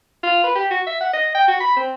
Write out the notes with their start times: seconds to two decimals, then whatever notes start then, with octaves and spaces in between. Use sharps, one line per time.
0.23 F4
0.44 B4
0.55 G4
0.71 F#4
0.87 E5
1.00 F#5
1.13 D#5
1.35 G5
1.48 F#4
1.60 B5
1.77 C4